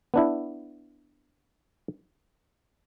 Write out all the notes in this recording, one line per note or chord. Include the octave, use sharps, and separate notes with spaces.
B3 D4 E4